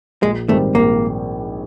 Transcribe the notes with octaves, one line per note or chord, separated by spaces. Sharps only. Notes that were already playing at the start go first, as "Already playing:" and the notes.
A#1 G#3
G#2 D#3 G3 A3 C4
A#1 A#3